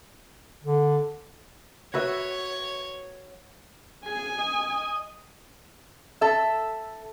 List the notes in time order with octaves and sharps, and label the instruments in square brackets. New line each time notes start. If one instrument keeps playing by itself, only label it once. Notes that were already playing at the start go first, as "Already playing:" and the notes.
[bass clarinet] D3
[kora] F#4 B4 E5 [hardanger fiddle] C#5
[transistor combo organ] G#4 [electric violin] G#5
[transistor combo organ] D#5
[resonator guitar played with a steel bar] A4 E5